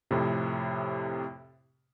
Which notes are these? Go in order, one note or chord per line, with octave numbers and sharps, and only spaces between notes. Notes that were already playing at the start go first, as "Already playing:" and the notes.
F2 A2 C3